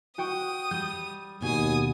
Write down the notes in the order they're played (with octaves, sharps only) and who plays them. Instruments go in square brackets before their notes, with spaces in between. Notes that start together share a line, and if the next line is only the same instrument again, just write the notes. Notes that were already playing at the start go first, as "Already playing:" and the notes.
[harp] F#4 G5 C#6 [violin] D#6
[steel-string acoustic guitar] G3 [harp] G6
[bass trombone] D#2 [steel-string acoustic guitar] B2 [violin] G#5 D#6